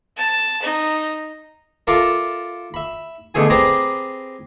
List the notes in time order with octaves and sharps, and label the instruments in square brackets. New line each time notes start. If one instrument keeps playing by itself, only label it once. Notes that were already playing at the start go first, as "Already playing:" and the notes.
[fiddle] A5
D#4
[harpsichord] F4 A4 A#4 D5 E5
E5 B5
B2 D3 A3 G#4 G#5
C4 G4 G#4 B4 D5 A#5